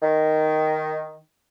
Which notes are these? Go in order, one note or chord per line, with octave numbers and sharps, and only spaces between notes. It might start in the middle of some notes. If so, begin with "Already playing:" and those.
D#3